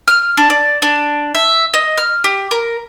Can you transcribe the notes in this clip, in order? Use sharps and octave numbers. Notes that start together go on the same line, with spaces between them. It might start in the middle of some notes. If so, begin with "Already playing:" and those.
F6
D4
D5
D4
E5
D#5
F6
G4
A#4